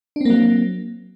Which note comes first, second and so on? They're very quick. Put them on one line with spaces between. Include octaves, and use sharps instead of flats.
D4 C4 A#3 F#3